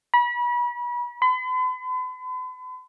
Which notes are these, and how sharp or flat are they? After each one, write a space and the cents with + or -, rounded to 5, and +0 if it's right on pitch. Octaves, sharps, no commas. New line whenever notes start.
B5 -35
B5 +45